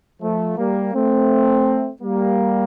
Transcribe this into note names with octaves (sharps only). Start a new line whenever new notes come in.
F3 A3
G3 A#3
A3 C4
G3 A#3